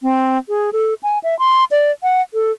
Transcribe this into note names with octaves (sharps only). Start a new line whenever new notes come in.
C4
G#4
A4
G#5
E5
C6
D5
F#5
A4